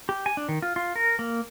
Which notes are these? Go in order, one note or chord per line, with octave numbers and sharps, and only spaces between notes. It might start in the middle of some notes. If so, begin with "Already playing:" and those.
G4
G#5
D4
D#3
F4
F4
A#4
A#3